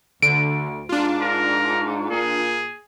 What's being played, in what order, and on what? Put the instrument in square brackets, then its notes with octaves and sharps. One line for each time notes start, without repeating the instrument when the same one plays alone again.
[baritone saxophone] D2 [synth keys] D3 [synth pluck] D7
[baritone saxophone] G#2 [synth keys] D4 F4
[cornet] A#4
[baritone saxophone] A#2 [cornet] G#4